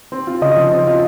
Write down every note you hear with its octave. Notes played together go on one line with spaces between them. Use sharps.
C4
F4
C#3 D#5
F3
C4
F4